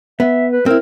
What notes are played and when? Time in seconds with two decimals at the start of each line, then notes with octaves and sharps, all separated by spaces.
0.20 B3 E5
0.52 B4
0.66 C4 E4 A#4